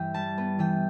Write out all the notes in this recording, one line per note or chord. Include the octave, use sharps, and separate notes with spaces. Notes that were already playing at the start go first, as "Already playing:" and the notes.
Already playing: G2 E3 G5
G3 A5
B3
E3 G5